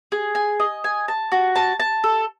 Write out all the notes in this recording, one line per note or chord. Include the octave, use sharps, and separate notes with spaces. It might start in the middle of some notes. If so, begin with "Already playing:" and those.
G#4
G#5
D#5
G#5
A5
F#4
A5
A5
A4